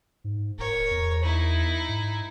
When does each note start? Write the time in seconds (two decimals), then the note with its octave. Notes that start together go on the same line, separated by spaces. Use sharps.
0.24 G#2
0.58 D1 A#4 C#5
0.91 E2
1.23 D#4 E4
1.88 G#2